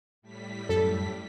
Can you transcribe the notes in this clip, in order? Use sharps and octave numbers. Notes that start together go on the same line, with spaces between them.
A2 G3 B6
F#2 A4